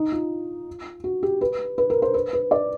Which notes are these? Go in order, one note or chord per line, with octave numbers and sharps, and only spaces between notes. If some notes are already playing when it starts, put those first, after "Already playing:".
Already playing: D#4
F4
F#4
G4
B4
B4
A#4
C5
B4
B4
D5